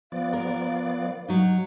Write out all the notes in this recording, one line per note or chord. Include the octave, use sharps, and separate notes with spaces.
F3 B3 D5 F5
A#4
F#3 D#4